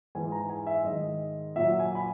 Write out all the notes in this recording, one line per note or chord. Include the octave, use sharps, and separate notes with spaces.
G#2 E3 G#3 G#5
A#5
G#5
E5
G#2 D#3 G#3 D#5
A#2 F#3 E5
G#5
B5